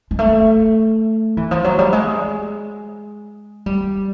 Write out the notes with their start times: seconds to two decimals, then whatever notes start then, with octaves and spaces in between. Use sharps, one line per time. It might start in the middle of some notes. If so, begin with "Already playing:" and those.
0.11 G#3
0.19 A3
1.37 E3
1.51 F3
1.64 F#3
1.79 G3
1.93 G#3
3.66 G3